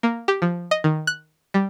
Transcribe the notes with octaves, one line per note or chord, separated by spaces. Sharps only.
A#3
G4
F3
D#5
D#3
F#6
G3